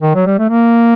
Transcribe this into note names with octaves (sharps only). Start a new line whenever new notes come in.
D#3
F#3
G3
A3
A#3